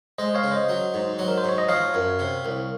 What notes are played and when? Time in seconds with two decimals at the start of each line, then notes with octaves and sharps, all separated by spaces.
0.18 G#3 C5 D#5
0.34 C#5 F5
0.44 C#3
0.51 C5 D#5
0.69 F#3
0.94 G#2
1.19 F#3
1.28 A#4
1.38 C5
1.44 G#2 C#5
1.58 D#5
1.69 F3 C#5 F5
1.94 F#2
2.19 C3
2.45 C2